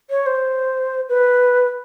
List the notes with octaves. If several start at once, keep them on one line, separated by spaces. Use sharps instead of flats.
C#5
C5
B4